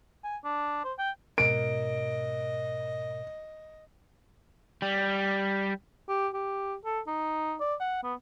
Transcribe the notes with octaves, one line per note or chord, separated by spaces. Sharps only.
G#5
D4
C5
G5
G#2 B2 A#4 D#5 D7
G3
G4
G4
A4
D#4
D5
F#5
B3